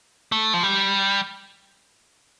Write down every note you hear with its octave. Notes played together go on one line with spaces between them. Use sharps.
A3
F3
G3